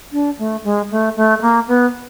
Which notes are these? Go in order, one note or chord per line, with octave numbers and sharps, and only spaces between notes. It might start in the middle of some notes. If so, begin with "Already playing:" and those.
D4
A3
G#3
A3
A3
A3
A#3
B3